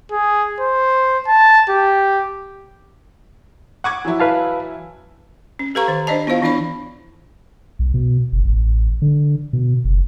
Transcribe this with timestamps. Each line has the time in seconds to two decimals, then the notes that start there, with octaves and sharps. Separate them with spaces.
0.12 G#4
0.61 C5
1.28 A5
1.69 G4
3.84 F#5 C#6 D6 G#6
4.05 E3 F#3 E4
4.20 B4 F5 A5
5.59 C#4
5.75 G4 A4 B4 F5 A#5 C#6
5.88 D#3
6.07 D4 C5 D5 D#5 A5
6.27 B3 E4 F4 C5 F5
6.42 E3 B3 D4 E4 D5 B5
7.79 B1
7.94 B2
8.32 F#1
8.45 A1
9.02 D3
9.53 B2
9.85 F#1